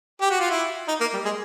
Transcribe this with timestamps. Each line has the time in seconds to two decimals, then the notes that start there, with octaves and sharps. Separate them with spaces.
0.21 G4
0.31 F#4
0.40 F4
0.51 E4
0.88 D#4
1.01 A#3
1.14 G3
1.25 G#3